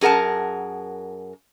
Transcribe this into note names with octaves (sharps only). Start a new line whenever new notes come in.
F#2 G#4 A#4 F#5 A5